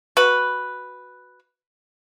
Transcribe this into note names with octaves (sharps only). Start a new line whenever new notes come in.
F#4 B4